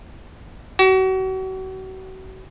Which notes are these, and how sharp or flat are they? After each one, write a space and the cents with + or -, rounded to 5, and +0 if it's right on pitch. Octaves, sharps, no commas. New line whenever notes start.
F#4 +35